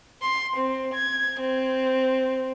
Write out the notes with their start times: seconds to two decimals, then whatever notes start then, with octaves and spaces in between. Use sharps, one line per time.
0.22 C6
0.57 C4
0.94 G#6
1.40 C4